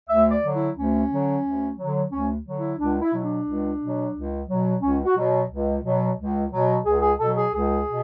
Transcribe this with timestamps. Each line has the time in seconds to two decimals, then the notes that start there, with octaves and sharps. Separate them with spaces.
0.08 D2 E5
0.31 D5
0.43 D3 F#3
0.54 E4
0.75 D2 C#4
1.10 D3 F#3
1.44 D2
1.77 D3 F#3
2.11 D2 C#4
2.45 D3 F#3
2.57 E4
2.79 C#2 D4
3.02 E4
3.13 B2 F#3 E4
3.24 D4
3.46 C#2
3.81 B2 F#3
4.14 C#2
4.48 B2 F#3
4.82 C#2 C#4
5.04 F#4
5.16 B2 F#3
5.50 C#2
5.83 B2 F#3
6.18 C#2
6.51 B2 F#3
6.85 C#2 G#4
7.02 G#4
7.19 B2 F#3 A4
7.36 G#4
7.53 C#2 G#4
7.87 B2